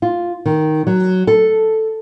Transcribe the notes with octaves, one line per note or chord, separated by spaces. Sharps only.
F4
D#3
F#3
A4